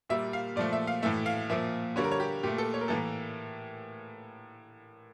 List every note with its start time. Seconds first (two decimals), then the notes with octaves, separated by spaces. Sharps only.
0.10 A#2 G3 A#3 E5
0.33 F5
0.56 A#2 F3 A3 D5
0.73 E5
0.87 F5
1.03 A2 E3 A3 E5
1.26 F5
1.50 A#2 F3 A#3 E5
1.96 D3 G3 A#3 C#5
2.04 A#4
2.11 C#5
2.20 G4
2.43 A#2 A3 G4
2.58 A4
2.74 C#5
2.81 A#4
2.88 A2 E3 A#3 A4
2.97 A#4